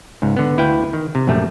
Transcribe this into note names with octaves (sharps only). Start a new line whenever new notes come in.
C#2 G#2
D3 B3
D2 E4 B4 F5 G5
D#3
C3
A#1 F#2 G3 A3